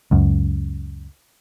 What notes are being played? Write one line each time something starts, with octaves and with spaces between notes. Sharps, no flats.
C#2 F#2